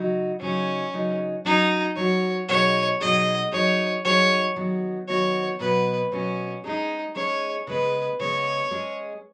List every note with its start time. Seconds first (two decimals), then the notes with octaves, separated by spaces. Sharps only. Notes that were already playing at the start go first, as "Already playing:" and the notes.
Already playing: C#3 F#3 D#4 F#4
0.41 C#3 F#3 C#4 D#4
0.93 C#3 F#3 D#4
1.45 F#3 C#4 D#4 F#4
1.96 F#3 C#4 F#4 C#5
2.48 B2 F#3 D#4 G#4 C#5
3.01 B2 F#3 D#4 G#4 D#5
3.52 F#3 D#4 G#4 C#5
4.05 F#3 D#4 G#4 C#5
4.56 D#3 F#3 B3 F#4
5.08 D#3 F#3 B3 F#4 C#5
5.60 B2 F#3 B3 B4
6.12 B2 F#3 B3 C#4
6.64 G#3 C#4 D#4 G#4
7.15 G#3 C#4 G#4 C#5
7.67 C#3 G#3 B3 B4
8.20 C#3 G#3 B3 C#5
8.71 G#3 C#4 G#4